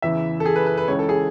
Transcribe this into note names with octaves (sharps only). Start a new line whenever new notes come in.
E2 C#3 E3 E5
A4
G#4
B4
B4
B4
C#2 C#3 E3 C#5
A4
G#4